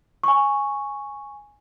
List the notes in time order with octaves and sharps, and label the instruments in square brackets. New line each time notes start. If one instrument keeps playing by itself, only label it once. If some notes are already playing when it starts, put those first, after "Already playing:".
[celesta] G#5 C#6